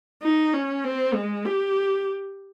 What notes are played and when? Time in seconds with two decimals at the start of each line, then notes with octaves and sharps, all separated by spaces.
0.22 D#4
0.53 C#4
0.84 C4
1.13 G#3
1.45 G4